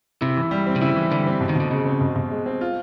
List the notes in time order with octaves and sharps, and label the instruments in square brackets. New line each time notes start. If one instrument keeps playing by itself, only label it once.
[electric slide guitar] C3 [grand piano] E4
[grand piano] E3
G3
C4
[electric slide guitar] C3
[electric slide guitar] C#3 [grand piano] E4
[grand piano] E3
[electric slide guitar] D3 [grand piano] G3
[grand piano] C4
B2
[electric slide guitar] D#3
[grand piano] B2 [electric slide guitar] D3
[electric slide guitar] C#3 [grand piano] G#3
[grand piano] C4
B2
B2
G#3
C4
F4